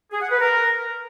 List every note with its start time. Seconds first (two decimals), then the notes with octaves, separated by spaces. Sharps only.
0.12 G#4
0.21 F#5
0.31 B4
0.41 A#4